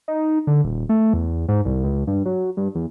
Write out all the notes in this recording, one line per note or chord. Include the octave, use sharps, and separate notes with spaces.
D#4
D3
D#1
A3
E2
G#2
C2
C#2
G2
F#3
G2
E2